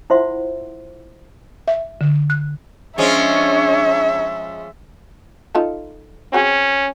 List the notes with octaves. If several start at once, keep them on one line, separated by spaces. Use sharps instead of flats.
E4 F4 C5 E5 F#5 C6
E5
D3
F#6
F3 G#3 C#4 D4 C#5 E5
D#4 F4 A4
F#3 C4 C#4 G#4